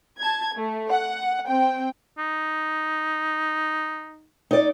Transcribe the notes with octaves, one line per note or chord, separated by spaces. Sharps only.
A5 G#6
A3
F#5
C4 G5
D#4
D#4 D5